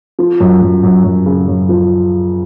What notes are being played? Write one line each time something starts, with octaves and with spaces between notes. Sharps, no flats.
F3
F#2
F#2
F#2
F#2
C#3
F#2
F3